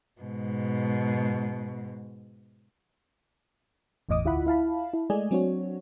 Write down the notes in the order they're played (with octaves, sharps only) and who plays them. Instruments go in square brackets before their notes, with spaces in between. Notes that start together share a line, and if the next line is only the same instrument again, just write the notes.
[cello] G#2 B2
[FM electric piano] G1 E2 A2 D#5 D6 D#6
D2 E4 F4 E5 F#5 B5
E4 F5 A5 B5
E4
G#3 A3 D5 D#5 G#5
F#3 C4 D4 F#4 C#5